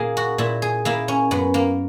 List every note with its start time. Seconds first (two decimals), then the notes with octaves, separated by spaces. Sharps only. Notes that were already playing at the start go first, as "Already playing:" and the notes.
Already playing: A#2 A#3 G#4 A#4
0.17 F#4
0.38 A#2 E4
0.62 G#4
0.85 A#3 E4
1.08 C#4
1.31 F#2 B3
1.54 A#3